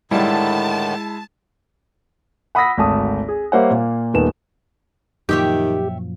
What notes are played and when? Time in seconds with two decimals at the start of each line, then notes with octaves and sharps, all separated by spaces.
0.11 A2 D3 D#3 G3 G#3 E4 A5
2.55 F#5 B5 D#6 E6 A#6 B6
2.78 G#1 D2 A5 D#6
3.28 G#4
3.52 G3 A#3 C5 C#5 E5 F#5
3.70 A#2 A#3
4.14 D#1 D#3 A3 B3 B4 E7
5.29 F#2 A#2 D#3 F3 G4 C#5 E5 G5